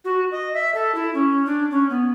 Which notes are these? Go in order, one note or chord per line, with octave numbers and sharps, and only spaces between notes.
F#4
D#5
E5
A4
E4
C#4
D4
C#4
B3